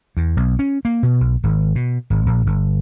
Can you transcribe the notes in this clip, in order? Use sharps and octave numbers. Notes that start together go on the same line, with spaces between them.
E2
B1
C#4
A#3
B2
B1
G#1
B2
G#1
A#1
G1